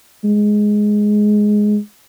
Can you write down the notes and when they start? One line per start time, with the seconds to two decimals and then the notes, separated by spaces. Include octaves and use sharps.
0.25 G#3